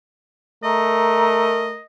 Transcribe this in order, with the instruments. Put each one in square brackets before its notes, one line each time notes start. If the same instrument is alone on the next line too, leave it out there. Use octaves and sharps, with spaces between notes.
[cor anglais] A3 [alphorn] A#4 [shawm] D#5 [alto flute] A#5